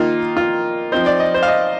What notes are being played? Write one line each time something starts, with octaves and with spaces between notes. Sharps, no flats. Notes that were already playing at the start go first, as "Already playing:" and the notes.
Already playing: D#3 A#3 D#4 F4
F4
F3 C4 D#4 C5
D5
D#5
C5
F5
D#5